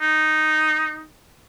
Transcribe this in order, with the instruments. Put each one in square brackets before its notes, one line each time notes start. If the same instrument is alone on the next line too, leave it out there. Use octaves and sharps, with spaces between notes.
[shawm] D#4